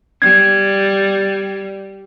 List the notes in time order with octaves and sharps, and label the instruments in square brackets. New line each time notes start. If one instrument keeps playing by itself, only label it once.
[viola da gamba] G3 [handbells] G#6